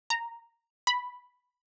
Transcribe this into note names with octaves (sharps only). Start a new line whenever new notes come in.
A#5
B5